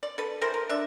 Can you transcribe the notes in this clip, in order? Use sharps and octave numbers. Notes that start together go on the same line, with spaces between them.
D5
A4 B4
E3 A#4 C5
A#4
D4 E5